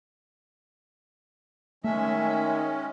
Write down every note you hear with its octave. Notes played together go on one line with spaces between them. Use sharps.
D#3 G#3 A3 C#4 E5